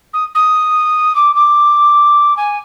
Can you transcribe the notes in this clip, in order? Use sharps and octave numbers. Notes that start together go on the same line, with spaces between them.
D#6
D#6
D6
D6
G#5